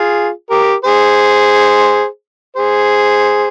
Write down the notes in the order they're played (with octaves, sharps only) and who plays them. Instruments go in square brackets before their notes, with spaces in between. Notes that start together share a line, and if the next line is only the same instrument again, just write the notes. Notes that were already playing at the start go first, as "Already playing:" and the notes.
Already playing: [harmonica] F4 G#4
G4 A#4
G#4 C5
G#4 C5